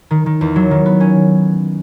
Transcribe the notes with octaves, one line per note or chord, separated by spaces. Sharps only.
D#3
D#3
E2
F#3
D#3
B3
C#4